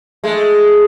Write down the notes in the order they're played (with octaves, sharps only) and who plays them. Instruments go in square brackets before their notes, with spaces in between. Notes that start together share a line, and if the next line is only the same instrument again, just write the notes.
[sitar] G#3 A3